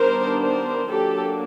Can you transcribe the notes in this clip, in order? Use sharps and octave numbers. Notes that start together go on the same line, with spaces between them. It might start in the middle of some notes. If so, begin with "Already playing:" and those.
Already playing: D#3 G3 B3 D4 A#4 C5
A#4 C5
F#3 A#3 D4 G4 A4